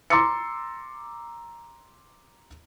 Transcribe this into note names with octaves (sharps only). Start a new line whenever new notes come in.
A#5 C6 D6 E6 A6 C#7